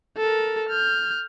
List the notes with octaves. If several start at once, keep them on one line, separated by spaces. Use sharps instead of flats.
A4 A#4
F6 G6